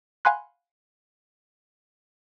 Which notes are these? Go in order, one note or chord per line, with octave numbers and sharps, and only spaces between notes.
F5 F#5 G#5 B5 C6 F#6